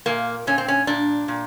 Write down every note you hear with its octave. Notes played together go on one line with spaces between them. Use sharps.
A#2 A#3
A#2 C#4
C4
C#4
A#2 D4
A#2